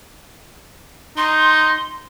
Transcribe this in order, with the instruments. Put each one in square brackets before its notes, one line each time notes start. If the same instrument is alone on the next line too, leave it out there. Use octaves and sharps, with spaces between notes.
[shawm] D#4 [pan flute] C6